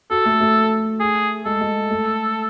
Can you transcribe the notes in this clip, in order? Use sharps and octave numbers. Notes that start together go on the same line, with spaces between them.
F#4 A4
A3
A3
G#4
G#3 A4
G#3
A3